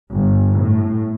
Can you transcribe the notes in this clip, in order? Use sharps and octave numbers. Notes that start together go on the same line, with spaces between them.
G1
A2